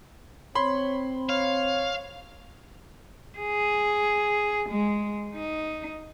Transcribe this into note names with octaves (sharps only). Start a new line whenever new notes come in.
C4 C#5 B5 C6
C#5 F5
G#4
G#3
D#4